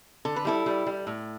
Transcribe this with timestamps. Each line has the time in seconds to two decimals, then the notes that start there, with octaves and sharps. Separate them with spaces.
0.25 D3 A4
0.36 B4
0.45 G3 E4 A4
0.66 G3
0.86 G3
1.07 A2